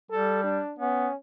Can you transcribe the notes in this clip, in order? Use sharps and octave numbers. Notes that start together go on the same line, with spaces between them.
G3 A4
D4
B3 C#4